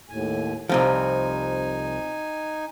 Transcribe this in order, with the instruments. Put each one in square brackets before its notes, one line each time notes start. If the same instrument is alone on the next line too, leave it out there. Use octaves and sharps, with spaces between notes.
[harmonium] D#2 A2 G#5
[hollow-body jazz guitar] C2 C3 F3 [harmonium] D#4 G#5